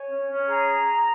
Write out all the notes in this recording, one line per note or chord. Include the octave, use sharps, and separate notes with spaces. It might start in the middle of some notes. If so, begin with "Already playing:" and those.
Already playing: C#5 G#5
C#4
C#4
G#4 A#5